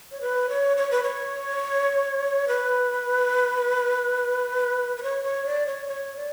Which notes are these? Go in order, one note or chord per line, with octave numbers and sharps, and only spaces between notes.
C#5
B4
C#5
C#5
B4
C#5
B4
B4
C#5
C#5
D5
C#5
C#5
D5